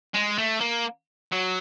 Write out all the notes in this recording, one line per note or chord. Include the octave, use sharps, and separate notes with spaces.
G#3
A3
A#3
F#3